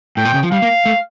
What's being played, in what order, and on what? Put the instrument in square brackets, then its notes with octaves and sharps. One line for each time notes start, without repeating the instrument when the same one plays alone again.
[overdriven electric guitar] A2 [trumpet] G5
[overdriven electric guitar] A#2
C#3
F3
[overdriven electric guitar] G3 [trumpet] F5
[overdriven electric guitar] A#3
A3